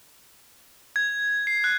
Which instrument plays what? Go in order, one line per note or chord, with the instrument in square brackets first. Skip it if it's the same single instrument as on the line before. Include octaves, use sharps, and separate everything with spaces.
[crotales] G#6
C7
F#6